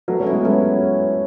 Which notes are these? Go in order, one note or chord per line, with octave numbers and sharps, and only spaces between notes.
F#3 A3 B4
A3 C#4
E4
G#3 B3
F#3 A3 C#4